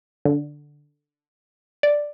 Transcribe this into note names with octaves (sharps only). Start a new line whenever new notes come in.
D3
D5